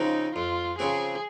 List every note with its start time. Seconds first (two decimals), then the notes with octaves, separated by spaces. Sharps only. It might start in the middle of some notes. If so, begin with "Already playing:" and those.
Already playing: C#3 F3 C4 D#4 F#4
0.35 F2 F4
0.79 C#3 F3 C4 F#4 G#4